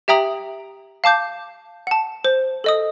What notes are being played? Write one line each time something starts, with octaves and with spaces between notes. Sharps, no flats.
G4 E5 G5 A#5 D#6 F#7
F5 A5 D6 G6
F#5 A5
C5
A4 D#5 D#6